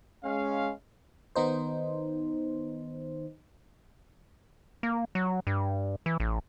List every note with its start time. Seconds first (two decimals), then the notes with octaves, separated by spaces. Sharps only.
0.24 G#3 C#4 F5
1.36 D#3 B3 D#4 C5
4.83 A#3
5.15 F#3
5.47 G2
6.06 E3
6.20 A1